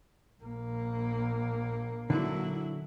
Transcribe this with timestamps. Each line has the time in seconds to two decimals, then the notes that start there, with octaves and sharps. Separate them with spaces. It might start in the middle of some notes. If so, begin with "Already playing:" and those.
0.42 A#1 A#3
2.10 D3 F#3 E4